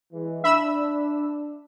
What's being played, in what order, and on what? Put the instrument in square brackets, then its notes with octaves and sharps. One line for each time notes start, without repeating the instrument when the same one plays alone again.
[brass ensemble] E3 G#3
[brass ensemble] D4 [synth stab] E5 B5 E6